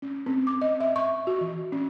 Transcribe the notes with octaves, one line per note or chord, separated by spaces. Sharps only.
C#4
C4
D6
D#5
E5
C#6
F#4
E3
C#4